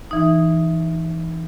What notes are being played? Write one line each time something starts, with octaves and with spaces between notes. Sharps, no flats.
E3 D#4